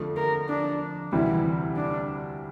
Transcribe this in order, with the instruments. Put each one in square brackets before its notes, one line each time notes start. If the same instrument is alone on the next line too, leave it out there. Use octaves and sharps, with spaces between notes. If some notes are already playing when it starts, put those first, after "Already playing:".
Already playing: [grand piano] F2 D3 F3 A3
[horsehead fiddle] A#4
D4
[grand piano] D2 C3 E3 G3 [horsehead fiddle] E4
[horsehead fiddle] D4